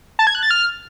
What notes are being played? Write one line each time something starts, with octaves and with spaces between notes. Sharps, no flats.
A5
G#6
F#6
A6
F6